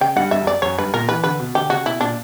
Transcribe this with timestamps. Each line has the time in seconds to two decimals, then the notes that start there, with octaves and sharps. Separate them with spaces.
0.01 C#3 G5
0.16 G2 F#5
0.31 G2 E5
0.42 F#2
0.47 D5
0.62 F#2 C#5
0.78 G2 B4
0.93 A#2 A#4
1.09 E3 B4
1.24 D3 B4
1.40 B2
1.55 D3 G4
1.70 C#3 F#4
1.86 B2 E4
2.01 A#2 D4